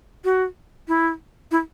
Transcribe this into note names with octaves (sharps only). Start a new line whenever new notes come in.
F#4
E4
E4